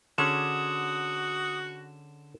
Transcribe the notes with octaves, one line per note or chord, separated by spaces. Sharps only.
D3 C#4 F#4 G#4 D#6 E7